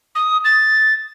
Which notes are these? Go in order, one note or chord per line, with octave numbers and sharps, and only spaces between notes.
D#6
A6